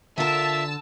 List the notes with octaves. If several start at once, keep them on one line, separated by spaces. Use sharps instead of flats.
D3 F4 A#4 E5 A5 E6